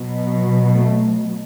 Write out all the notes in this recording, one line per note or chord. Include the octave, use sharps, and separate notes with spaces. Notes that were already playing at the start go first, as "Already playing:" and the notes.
Already playing: B2 F#3
A3